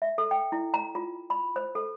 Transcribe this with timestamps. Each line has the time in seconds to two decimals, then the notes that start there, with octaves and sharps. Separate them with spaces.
0.02 E5
0.18 A4
0.31 G5
0.52 E4
0.74 A#5
0.95 F4
1.30 B5
1.56 C5
1.75 A4